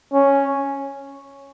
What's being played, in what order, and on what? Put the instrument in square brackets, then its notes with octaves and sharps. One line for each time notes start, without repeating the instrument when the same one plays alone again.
[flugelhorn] C#4